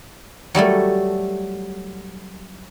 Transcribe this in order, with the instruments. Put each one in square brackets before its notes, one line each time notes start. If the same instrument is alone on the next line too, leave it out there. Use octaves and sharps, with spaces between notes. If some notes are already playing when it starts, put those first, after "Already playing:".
[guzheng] F#3 G3 A3 A4